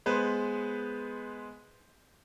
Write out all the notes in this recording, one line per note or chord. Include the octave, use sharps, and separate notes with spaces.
G#3 B3 B4 C5